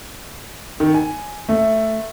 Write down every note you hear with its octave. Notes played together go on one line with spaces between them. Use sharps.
D#3
G#5
A3